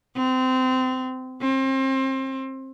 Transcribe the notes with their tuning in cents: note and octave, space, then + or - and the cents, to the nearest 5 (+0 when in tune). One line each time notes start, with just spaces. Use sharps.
C4 -25
C4 +30